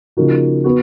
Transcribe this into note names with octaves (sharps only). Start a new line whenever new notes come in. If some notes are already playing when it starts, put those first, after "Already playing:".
C#3 F3 A#3 D#4 F#4
B3 F#4